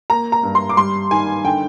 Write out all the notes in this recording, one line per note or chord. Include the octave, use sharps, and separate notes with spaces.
A#3 A#5
A#5
G2
C6
D6
G3 C6
D#3 G#5
D3 G5